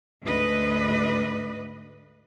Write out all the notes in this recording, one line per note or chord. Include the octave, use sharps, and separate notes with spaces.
D2 G#2 B4 D#5